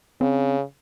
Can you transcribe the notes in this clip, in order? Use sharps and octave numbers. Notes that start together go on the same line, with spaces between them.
C#3 C4